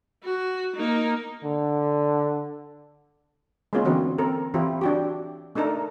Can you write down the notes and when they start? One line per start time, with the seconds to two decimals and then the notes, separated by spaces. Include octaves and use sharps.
0.24 F#4
0.76 A#3 D#4
1.44 D3
3.73 G#3 A#3 B3 C#4 F4
3.84 D3 E3 C4 F#4
4.18 C4 A4 A#4
4.54 E3 C4 E4 F4 G4
4.81 D4 F#4 G4
5.55 A3 D4 D#4 A4 A#4